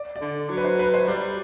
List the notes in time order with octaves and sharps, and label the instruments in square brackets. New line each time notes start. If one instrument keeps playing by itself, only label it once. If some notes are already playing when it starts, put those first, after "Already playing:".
Already playing: [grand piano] D5
D5
[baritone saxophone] D3
F#3
[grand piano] B4
C5
B4
C5
[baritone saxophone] G3 [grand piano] D5